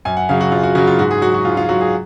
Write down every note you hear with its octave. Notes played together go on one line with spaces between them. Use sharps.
F#2 G#5
F#5
C#3 F#3 F5
F#4
F#2 F4
F#4
C#3 F#3 F#4
F4
G#2 F#4
G#4
F#3 F#4
F#4
G#2 F4
F4
F#3 F#4
G#4